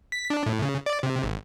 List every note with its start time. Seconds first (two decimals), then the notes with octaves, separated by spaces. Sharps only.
0.12 B6
0.30 D4
0.46 A2
0.62 C#3
0.86 D5
1.03 C3
1.23 G#1